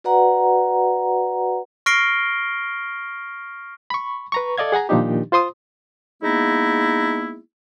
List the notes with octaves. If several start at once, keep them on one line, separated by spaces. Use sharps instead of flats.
F#4 B4 D5 F#5 A#5
C#6 F6 A#6 C7 D7 G7
B5 C#6
B4 A#5 C#6
A4 D5 D#5 F5 G#6
G#4 F#5 G#5 A#5
A#2 D#3 F3 D4 D#4 G4
F4 C5 C6 D#6
G#3 A#3 B3 D#4 E4